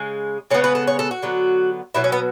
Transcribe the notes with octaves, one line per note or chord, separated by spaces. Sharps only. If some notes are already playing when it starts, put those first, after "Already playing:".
Already playing: C#3 G#3
C#3 G#3 B3 C#5
B4
A4
C#5
A4
F#4
D3 F#3 B3
B2 F#3 B3 E4
C#4
B3